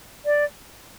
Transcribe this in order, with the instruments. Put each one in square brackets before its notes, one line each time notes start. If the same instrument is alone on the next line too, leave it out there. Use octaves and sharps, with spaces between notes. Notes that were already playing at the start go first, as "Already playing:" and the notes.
[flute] D5